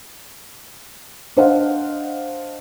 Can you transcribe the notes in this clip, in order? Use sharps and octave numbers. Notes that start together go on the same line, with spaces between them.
D4 C5 D#5 F5 F#5